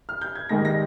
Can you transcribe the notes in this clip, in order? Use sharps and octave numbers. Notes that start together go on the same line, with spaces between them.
F6
G6
G#6
G#2 D#3 G3 A#6
A#6